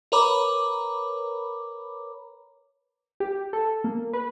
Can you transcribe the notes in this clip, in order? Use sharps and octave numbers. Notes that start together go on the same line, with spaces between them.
A#4 B4 C#5 A#5 B5 D6
G4
A4
A#3
B4